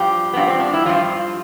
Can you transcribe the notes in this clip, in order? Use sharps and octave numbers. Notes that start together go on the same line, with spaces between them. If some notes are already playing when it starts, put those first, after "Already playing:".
Already playing: G2 F3 G4
G2 F3 B3
C4
D4
E4
G2 F3 F4